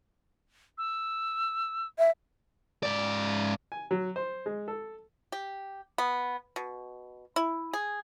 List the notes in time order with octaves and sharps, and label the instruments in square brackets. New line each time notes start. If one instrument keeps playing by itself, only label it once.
[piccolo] E6
[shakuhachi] E5
[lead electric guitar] G#2 D5
[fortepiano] G#5
F#3
C5
G#3
A4
[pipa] G4
B3
B2
E4
G#4